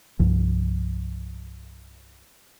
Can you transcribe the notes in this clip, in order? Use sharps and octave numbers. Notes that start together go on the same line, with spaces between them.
C2 G2 F3